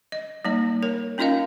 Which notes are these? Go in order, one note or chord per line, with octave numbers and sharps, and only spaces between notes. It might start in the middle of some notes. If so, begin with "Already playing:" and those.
D#5
G3 A#3 D#4 D#5
A#4 C#5
C#4 D#4 F4 A#4 D#5 F5